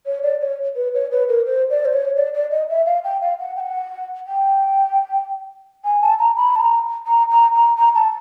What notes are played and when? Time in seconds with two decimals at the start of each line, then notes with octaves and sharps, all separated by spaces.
0.06 C#5
0.23 D5
0.41 C#5
0.76 B4
0.94 C#5
1.11 B4
1.29 A#4
1.46 C5
1.70 D5
1.85 C5
1.93 C#5
2.16 D5
2.34 D5
2.51 D#5
2.70 E5
2.86 F5
3.04 G5
3.21 F5
3.40 F#5
3.56 G5
3.60 F#5
4.27 G5
5.85 G#5
6.02 A5
6.19 A#5
6.36 B5
6.56 A5
6.60 A#5
7.07 A#5
7.31 A#5
7.54 A#5
7.77 A#5
7.95 A5